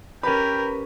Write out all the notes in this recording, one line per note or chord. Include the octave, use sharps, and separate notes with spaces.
C#4 G4 A#4 B4 G5 B5